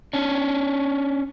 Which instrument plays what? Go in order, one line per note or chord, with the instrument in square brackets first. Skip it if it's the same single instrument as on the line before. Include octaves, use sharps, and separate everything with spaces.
[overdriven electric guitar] C#4 D4